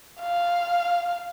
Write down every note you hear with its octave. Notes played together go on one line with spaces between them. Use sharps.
F5